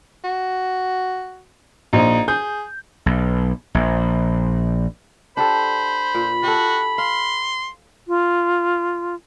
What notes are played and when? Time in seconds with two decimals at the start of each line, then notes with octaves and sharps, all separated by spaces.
0.24 F#4
1.93 A#1 D#4
2.28 G#4 G6
3.06 B1
3.75 A#1
5.37 D4 G4 A4 C5 B5
6.14 A#2
6.43 F#4 G4 A4
6.98 F5 C6
8.08 F4